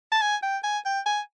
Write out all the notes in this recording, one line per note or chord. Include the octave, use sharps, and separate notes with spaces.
A5
G#5
G5
G#5
G5
G#5